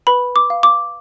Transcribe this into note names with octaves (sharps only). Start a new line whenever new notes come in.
B4 B5
D6
F5
D6